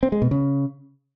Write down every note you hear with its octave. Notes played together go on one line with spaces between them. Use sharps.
C4
G#3
B2
C#3